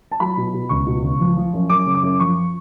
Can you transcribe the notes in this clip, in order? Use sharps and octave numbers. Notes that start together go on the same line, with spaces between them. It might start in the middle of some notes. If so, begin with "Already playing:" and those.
A5
F#3 B5
B2
B2
C#2 C#6
B2
C#2
F3
F3
F#2
F#2 D6
C#3
D6
F#2
F3 C#6